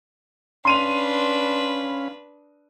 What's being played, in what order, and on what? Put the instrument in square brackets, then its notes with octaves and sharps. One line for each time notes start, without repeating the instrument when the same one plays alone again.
[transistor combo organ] C#4 F5 B5 [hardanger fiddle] D4 B4 [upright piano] C6 D#7 F7